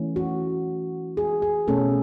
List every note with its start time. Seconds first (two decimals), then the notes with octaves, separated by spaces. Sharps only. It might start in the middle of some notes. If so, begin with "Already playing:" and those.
Already playing: E3 A3 C#4
0.16 F#4
1.17 G#4
1.42 G#4
1.68 B2 A3 C#4 A4